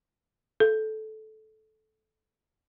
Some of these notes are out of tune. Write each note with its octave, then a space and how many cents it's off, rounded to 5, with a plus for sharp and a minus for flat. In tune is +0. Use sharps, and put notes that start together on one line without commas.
A4 -15